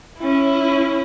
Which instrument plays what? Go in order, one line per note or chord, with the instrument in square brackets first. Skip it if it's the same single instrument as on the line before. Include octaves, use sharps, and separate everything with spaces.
[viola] C#4 E4